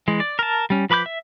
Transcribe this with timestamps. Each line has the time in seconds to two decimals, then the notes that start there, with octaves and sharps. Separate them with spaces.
0.08 E3 G#3
0.20 D5
0.39 A#4 A5
0.70 G3 C#4
0.90 F3 B4 B5 D6 G6
1.06 E5